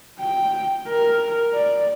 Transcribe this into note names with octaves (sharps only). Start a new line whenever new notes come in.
G5
A#4
D5